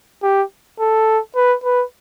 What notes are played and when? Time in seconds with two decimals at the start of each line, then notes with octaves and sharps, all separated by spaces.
0.23 G4
0.80 A4
1.35 B4
1.64 B4